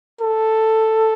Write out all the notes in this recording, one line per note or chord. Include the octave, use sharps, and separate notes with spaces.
A4